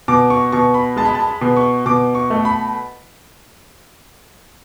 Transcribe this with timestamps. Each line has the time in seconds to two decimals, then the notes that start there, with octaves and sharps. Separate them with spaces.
0.08 B2 D6
0.30 C#6
0.52 B2 C#6
0.74 B5
0.96 G#3 A5
1.05 B5
1.15 A5
1.27 B5
1.41 B2
1.57 C#6
1.86 B2 D6
2.15 C#6
2.30 A3
2.45 B5